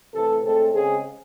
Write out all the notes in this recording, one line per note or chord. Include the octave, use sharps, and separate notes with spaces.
C3 E3 A3 A4
A2 G#3 C4 A4
C#3 G#3 C4 G#4